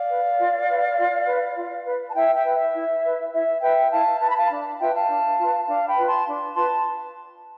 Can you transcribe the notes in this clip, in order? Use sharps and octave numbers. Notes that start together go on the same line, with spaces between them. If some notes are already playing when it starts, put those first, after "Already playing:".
Already playing: D5 F5
B4
F4
B4
F4
B4
F4
B4
A5
E4 E5 G5
E5 G5
B4
E5
E4
B4
E4 E5
B4 E5 G5
E4 F5 A5
B4 A5
B5
F5 A5
D4
F4 B4 E5 G5
F5 A5
D4
F4 B4
D4 F5 A5
G5 B5
F4 B4
A5 C6
D4
F4 B4 A5 C6